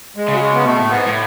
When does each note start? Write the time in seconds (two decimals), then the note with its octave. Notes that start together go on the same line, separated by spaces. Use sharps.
0.16 G#3
0.28 C#3 F#3
0.40 G#3
0.54 B3
0.65 B2 A3
0.78 A2
0.90 G#2 B3
1.06 A2